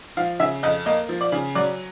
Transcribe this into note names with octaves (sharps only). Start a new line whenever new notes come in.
F3 F5
C#3 E5
F2 D#5
A#3 D#5
F3
D5
C#3
F#3 D5